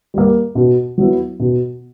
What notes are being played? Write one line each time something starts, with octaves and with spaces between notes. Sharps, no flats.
G3 A#3
B2
F#3 B3 E4
B2